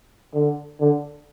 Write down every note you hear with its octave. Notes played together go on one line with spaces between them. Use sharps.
D3
D3